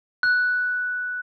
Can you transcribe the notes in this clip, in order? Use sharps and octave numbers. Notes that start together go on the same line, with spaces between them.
F#6